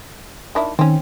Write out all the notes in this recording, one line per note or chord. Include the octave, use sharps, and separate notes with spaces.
D#3 D4 E4
D#3 C4 C#4